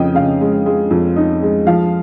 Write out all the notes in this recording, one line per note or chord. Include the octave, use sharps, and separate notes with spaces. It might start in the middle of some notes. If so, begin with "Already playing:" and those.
Already playing: F2 C#3 D#5 G5
C#3 F5
G#3
G#3
F2
D#4
G#3
F3 F5